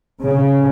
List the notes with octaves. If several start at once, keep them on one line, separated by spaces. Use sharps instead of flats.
C#3